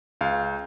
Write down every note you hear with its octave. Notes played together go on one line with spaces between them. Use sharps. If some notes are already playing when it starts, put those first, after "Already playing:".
C#2 F5